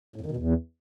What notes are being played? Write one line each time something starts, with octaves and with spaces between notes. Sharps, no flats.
A2
F2
D#3
B2
E2